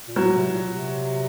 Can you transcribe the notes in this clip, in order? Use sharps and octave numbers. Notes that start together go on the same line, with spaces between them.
A#2
A2 F#3
C3
A#2
C3